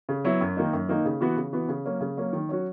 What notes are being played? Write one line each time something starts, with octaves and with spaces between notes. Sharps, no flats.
C#3
F#3 B3 E4
F#2
D#3 A#3 D#4
F#2
D#3 A#3 D#4
C#3
E3 B3 F#4
C#3
E3 B3 F#4
C#3
F#3 A#3 C#4
C#3
F#3 A#3 C#4
D#3
F#3 C#4 F#4